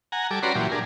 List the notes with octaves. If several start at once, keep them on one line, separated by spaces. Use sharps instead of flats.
F#5 G#5 A#5
G3 A4 D6
C#4 F#4 B4 D5 A#5 C6
A#2 E3 F#3 G4
D4 G#4 A#4